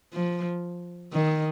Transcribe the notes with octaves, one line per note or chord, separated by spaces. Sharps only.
F3
D#3